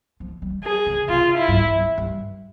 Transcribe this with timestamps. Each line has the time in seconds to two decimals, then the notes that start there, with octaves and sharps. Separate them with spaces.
0.20 F3
0.42 G3
0.64 G#4
0.86 C#3
1.09 C3 F4
1.38 E4
1.48 G2
1.53 F2
1.75 F2
1.98 G2